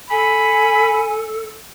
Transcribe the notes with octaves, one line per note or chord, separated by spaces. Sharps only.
A4 G#5 B5